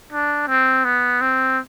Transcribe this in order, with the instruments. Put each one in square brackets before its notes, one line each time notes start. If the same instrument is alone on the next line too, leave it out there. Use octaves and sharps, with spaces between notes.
[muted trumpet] D4
C4
B3
C4